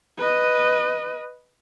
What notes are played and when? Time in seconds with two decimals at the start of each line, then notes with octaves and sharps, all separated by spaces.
0.18 B4 D#5